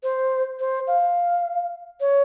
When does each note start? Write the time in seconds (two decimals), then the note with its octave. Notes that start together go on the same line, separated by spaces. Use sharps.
0.03 C5
0.60 C5
0.87 F5
2.01 C#5